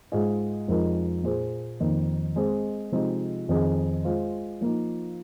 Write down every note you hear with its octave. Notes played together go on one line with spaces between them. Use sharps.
G#2 G#3 F4 G#4 D#5
F2 F3 G#3 D#4 A#4
A#2 A#3 G#4 C5
F2 D#3 A#3
G#3 C4 G#4 C5 D#5
C3 F3 G#3 C4 D#4
F2 D#3 C4 G#4 D#5
G#3 F4 C5
F3 A#3 D#4